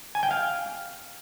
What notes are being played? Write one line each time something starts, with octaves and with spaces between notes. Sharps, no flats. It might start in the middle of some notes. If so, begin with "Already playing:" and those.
G#5
G5
F5